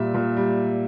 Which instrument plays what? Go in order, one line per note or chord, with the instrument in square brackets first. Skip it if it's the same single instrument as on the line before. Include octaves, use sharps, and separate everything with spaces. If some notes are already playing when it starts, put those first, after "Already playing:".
Already playing: [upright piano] A#2 G3 E5
A#2
G3